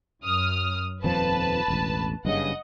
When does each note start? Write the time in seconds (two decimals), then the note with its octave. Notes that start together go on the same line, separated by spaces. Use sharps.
0.23 F#2 D#6 F6
1.04 D#1 F2 F3 B4 A5
1.68 E1 A1
2.25 F#1 G2 C#3 D#5 F#5